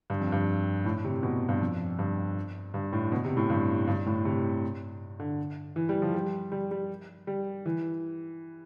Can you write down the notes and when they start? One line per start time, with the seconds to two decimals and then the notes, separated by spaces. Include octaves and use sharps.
0.10 G2
0.21 F2
0.32 G2
0.85 A2
1.04 C3
1.23 B2
1.49 G2
1.61 F2
1.99 G2
2.74 G2
2.93 A2
3.12 B2
3.25 C3
3.37 A2
3.50 G2
3.87 G2
4.06 A2
4.25 C3
5.20 D3
5.76 E3
5.89 G3
6.02 F3
6.14 G3
6.52 G3
6.71 G3
7.27 G3
7.66 E3